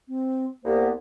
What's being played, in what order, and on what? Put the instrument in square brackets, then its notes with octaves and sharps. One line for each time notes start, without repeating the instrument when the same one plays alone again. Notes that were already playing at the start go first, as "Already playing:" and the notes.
[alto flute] C4
[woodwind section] C2 A#3 B3 [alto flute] C5